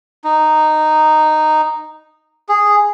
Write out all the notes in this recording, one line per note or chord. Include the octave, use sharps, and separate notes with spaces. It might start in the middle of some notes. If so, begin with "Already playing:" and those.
D#4
G#4